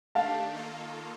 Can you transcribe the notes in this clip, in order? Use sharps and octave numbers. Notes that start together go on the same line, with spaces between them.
D#3 A3 D4 G4 F5 A5
D#3 A#3 F4 A4